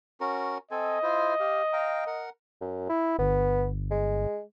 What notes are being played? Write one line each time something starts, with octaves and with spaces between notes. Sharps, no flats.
C#4 F#4 A#4
C4 A4 D#5 G#5
E4 F4 C5
G4 F5
F5 G5 A#5
A#4 F#5
F#2
E4
G1 B3
G#3